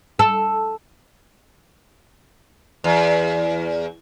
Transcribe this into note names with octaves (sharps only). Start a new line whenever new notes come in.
A4
E2